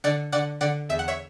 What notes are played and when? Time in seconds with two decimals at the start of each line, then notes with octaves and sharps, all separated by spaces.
0.04 D3 D5 F#5
0.32 D3 D5 F#5
0.61 D3 D5 F#5
0.89 E2 E5
0.99 F#5
1.08 C#5 E5